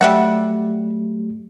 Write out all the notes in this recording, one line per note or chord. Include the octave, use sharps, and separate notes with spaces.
F#3 G3 A3 G4 E5 F#5